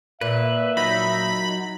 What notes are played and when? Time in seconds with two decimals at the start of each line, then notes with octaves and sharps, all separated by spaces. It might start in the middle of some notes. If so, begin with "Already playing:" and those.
0.21 A#2 B4 E5
0.77 F#3 D#4 B5